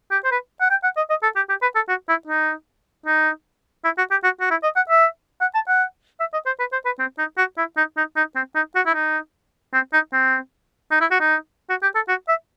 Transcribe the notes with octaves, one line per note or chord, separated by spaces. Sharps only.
G4
C5
B4
F#5
G5
F#5
D#5
D#5
A4
G4
G4
B4
A4
F#4
E4
D#4
D#4
E4
F#4
G4
F#4
F#4
E4
D#5
F#5
E5
F#5
A5
F#5
E5
D#5
C5
B4
C5
B4
C4
D#4
F#4
E4
D#4
D#4
D#4
C4
D#4
F#4
E4
D#4
C4
D#4
C4
D#4
E4
F#4
D#4
F#4
G4
A4
F#4
E5